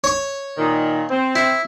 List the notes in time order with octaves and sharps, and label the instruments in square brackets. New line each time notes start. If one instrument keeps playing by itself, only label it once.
[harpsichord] C#5 C#6
[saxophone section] A#2 D#3
C4
[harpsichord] E4